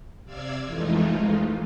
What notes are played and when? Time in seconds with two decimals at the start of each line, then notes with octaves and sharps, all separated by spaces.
0.25 C3 D5 F5 E6 G#6
0.65 F2 E3 G#3 A3 D#4 F4